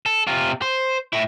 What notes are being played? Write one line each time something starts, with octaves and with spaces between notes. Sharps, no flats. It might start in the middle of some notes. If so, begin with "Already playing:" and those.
A4
C3 F4
C5
A2 E4